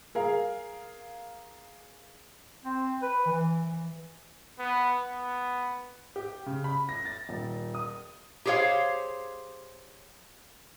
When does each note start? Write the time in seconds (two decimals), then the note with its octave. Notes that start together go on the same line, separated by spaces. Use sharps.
0.15 G#4 A#4 F5
2.64 C4
3.02 B4
3.26 E3
3.66 E3
4.59 B3
5.00 B3
6.16 G4
6.46 C#3
6.64 B5
6.89 A#6
7.05 A6
7.29 D#1
7.75 D#6
8.45 G4 G#4 C5 C#5 F5